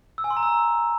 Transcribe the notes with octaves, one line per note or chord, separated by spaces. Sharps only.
E6
G#5
C6
A#5
E6